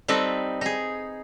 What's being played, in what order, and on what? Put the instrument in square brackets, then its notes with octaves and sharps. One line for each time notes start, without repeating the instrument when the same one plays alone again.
[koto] G3 C4 D#4 A4 B4
D#4 G#4